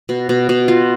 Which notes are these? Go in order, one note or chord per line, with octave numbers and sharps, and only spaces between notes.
B2
B2
B2
F4